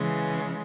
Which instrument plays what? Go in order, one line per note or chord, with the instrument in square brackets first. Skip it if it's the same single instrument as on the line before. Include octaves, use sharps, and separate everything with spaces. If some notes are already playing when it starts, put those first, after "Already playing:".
Already playing: [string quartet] C#3 E3 G#3